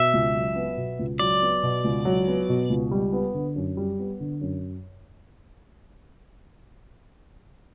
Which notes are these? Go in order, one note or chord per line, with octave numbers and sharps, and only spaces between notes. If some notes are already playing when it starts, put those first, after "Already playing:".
Already playing: B2 E5
C#2
F#3
B3
B2
C#2
F#3 D5
B3
B2
C#2
F#3
B3
B2
C#2
G3
B3
D3
F#2
G3
B3
D3
F#2